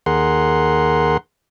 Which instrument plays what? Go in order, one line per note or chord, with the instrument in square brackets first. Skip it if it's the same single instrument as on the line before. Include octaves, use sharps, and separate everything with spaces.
[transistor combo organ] D#2 G#4 A#4 F#5 C6